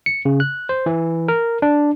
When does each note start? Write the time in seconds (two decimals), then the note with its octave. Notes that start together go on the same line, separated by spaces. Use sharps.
0.06 C#7
0.25 C#3
0.40 F#6
0.69 C5
0.86 E3
1.28 A#4
1.62 D4